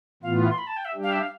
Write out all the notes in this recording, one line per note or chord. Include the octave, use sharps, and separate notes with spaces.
A2 E3 B3 F4 F5
C6
B5
A5
G5
E5
G3 D4 G4
F5
E5
F5